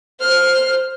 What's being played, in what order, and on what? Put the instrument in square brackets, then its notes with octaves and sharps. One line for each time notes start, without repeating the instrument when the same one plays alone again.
[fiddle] C5 F6